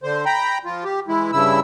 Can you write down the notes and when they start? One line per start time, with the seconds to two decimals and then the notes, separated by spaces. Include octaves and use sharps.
0.03 D3 C5
0.26 G5 A#5 B5
0.65 F3 F4
0.84 G4
1.08 E3 G#3 E4
1.33 G2 C#3 E4 E6